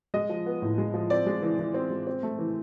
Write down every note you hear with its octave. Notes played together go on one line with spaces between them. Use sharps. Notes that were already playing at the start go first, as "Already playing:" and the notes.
G#3 D#5
F3
B3
A2
G#3
F3
C4 D5
G#3
E3
E3
C4
G#3
C4
A3
E3